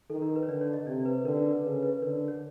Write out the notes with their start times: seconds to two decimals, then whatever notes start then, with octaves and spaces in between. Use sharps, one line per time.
0.10 D#3 A4
0.22 A#4
0.36 B4
0.43 C#5
0.48 D3 D5
0.61 C#5
0.73 D#5
0.87 C3 D5
1.05 B4
1.25 D3 A#4
1.38 B4
1.51 A#4
1.63 C#3 B4
1.83 B4
2.02 D3 A#4
2.28 C#5